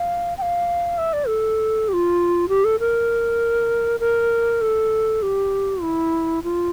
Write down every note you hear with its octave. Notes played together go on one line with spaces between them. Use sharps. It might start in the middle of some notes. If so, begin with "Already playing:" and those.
Already playing: F5
G5
F5
E5
D5
A4
G4
F4
G4
A4
A#4
A#4
A4
G4
E4
F4